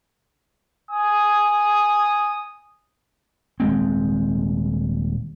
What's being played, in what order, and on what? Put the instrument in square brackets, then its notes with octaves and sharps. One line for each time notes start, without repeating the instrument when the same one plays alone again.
[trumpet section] G#5 D#6
[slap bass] D#1 G#3 C4